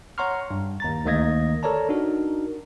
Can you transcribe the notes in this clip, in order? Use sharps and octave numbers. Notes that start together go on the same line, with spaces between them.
C#5 F#5 A#5 C6 C#6 F6
G2
D#2 A#5 A6
D2 D#3 A#3 D#5 G#6 A#6
A4 A#4 C#5 D5 A5 A#5
D4 D#4 F#4 A#4